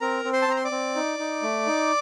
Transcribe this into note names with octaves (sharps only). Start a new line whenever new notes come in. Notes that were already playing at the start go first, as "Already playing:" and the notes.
C4 A#4 A#5
C4
C5 C6
A5
C4 A#5
C6
D5 D6
C4
D#4
D#4
A3
D#4